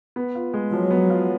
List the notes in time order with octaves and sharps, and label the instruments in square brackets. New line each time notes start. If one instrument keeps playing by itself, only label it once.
[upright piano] B3
F4
G#3
[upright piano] F3 [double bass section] F#3
[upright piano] B3
F4